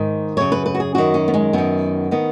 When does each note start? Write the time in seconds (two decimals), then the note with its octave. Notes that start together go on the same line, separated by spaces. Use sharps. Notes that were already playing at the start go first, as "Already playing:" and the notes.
Already playing: G#2 D#3
0.37 F#2 C#3 C#5
0.52 B4
0.66 B4
0.75 F#4
0.80 G#4
0.95 F#2 D#3 F#4
1.14 C#4
1.28 B3
1.34 G#3
1.53 F#2 D#3 B3
2.11 D#3 B3